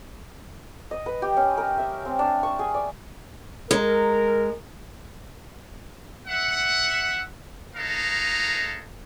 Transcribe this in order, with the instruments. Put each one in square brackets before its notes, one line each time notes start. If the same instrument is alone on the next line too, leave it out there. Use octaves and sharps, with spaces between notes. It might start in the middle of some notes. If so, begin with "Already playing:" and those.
[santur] D#5
B4
G4
C#4
A#4
E5
C4
D4
C#6
G#4
D5
[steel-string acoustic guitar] G#3 [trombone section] A#4
[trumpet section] E5 F#5
G#3 D#4 A4 B4 F5 A#5